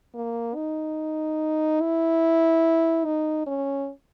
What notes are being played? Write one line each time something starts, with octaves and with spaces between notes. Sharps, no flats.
A#3
D#4
E4
D#4
C#4